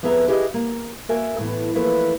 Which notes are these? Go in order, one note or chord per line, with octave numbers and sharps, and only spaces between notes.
F2 B3 G#4 B4 E5 A#5
E4 G4 G#4 B4 C5 D#5
A#3
A#3 F#4 A#4 E5 G#5
A2 E3 B3
E3 F3 A3 A#3 B4